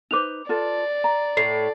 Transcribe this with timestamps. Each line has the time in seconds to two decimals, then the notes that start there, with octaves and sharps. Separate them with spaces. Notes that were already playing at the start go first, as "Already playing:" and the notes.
0.11 D#4 B4 C5 D6 F7
0.49 F4 A4 B4 D5
1.04 A#5
1.37 A2 C7